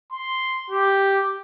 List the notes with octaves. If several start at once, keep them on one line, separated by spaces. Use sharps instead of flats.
C6
G4